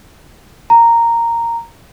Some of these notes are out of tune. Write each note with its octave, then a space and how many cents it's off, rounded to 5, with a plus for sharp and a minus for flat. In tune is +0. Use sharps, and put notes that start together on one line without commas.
A#5 -5